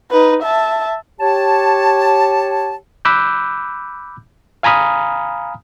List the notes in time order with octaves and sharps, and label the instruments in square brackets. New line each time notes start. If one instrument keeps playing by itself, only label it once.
[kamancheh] D#4 B4
E5 A5
[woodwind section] G4 C#5 A5
[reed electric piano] B5 D6 E6 F#6 G6
F5 G#5 A#5 B5 D#6 F6